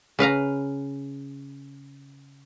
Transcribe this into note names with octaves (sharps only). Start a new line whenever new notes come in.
C#3 B4 F5 A#5